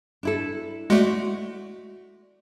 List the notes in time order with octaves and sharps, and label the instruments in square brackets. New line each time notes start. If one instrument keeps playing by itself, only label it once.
[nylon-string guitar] D4 E4 A4
[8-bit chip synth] G#3 A3 [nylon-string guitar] F#4 D5